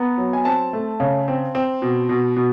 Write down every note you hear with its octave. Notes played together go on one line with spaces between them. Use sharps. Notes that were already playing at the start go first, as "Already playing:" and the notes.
Already playing: B3 A#5
F#3
G#5
C4 A5
A3
C#3
C4
C4
B2
B2
B2